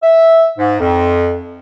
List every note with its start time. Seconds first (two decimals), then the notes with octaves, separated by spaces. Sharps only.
0.03 E5
0.58 G#2
0.80 F2